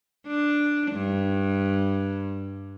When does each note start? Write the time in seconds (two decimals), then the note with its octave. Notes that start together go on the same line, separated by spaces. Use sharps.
0.27 D4
0.91 G2